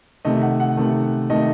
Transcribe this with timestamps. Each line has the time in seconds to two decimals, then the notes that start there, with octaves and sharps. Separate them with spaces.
0.25 C3 D#3 A3 D#5
0.42 F#5
0.60 F#5
0.77 C3 D#3 A3
1.30 C3 D#3 A3 D#5